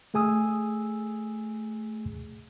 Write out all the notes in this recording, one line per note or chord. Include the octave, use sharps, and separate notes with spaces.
A3 G#4 G#5 D#6 E6